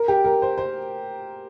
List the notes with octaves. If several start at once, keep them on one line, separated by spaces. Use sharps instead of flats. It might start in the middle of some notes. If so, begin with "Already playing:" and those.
Already playing: A#4
G4
A#4
C5
C5